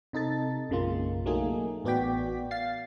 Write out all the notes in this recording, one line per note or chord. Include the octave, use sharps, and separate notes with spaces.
C3 D#4 A4 A6
B1 F#2 C#3 G#3 A#3 F4
F#3 A3 A#3 D#4 G#4
A1 B3 F#4 D5 G5 B6
F5 A6 C7